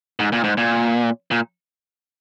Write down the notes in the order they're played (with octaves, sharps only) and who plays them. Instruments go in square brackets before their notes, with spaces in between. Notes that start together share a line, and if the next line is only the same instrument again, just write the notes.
[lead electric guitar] G#2
A#2
G#2
A#2
A#2